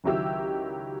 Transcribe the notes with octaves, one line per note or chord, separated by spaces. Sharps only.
C#2 D#3 F#3 E4 G4 E6